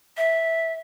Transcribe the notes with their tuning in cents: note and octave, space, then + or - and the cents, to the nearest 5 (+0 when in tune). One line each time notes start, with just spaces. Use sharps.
E5 -10